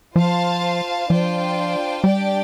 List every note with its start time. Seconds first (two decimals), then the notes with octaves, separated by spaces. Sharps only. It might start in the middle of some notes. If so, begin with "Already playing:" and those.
0.16 F3 F4 C5 F5 A5
1.10 F3 D4 F4 C5 G5
2.04 G3 D4 G4 D5 G5